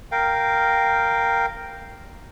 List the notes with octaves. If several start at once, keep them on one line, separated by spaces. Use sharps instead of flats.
A#4 F5 G5